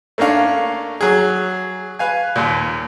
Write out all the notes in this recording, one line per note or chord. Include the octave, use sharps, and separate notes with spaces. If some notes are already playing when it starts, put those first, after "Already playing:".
A3 A#3 C#4 D4 F5
F#3 G#4
B4 F5 G#5
D#2 A#2